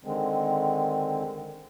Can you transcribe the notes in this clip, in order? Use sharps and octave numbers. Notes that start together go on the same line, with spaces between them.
D3 D#3 G#3 C4